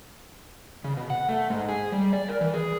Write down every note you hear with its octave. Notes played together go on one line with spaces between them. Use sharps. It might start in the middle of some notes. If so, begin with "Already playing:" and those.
C#3
B2
F#5
A3
G#2
G#4
G3
D5
A#4
E3
G#4